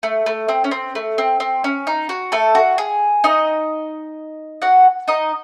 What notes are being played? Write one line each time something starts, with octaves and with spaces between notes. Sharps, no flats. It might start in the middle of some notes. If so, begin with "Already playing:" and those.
A3
A3
C4
C#4
C4
A3
C4
C4
C#4
D#4
F#4
A3 A4
F#4
G#4
D#4 D#5
F#4 F#5
D#4 D#5